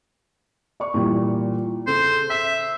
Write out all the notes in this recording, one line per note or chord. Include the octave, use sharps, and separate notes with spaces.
D5 C#6
A#2 E3 G3
C#3 A4 C5
E5 B6